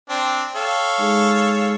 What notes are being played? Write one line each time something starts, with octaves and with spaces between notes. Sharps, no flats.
C4 D4 G5
A4 C#5 F5
G#3 D#4 G#4